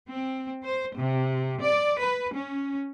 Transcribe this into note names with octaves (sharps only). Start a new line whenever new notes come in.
C4
C5
C3
D5
B4
C#4